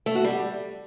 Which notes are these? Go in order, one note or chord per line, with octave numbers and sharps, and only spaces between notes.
A3
F#4
G3